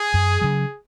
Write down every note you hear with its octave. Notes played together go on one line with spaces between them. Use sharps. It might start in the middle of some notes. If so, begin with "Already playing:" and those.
Already playing: G#4
F#2
C#3 F#3